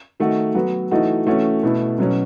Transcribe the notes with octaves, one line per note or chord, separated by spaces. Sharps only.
D#3 A3 D#4 F#4
F#3 B3 F#4
E3 A3 D#4 F#4
E3 A3 C#4 F#4
B2 A3 E4
B2 F#3 C#4